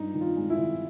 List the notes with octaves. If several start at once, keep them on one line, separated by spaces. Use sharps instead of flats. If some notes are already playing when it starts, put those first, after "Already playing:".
Already playing: G2 D#4
D#3
F4
G#3
E4
D#3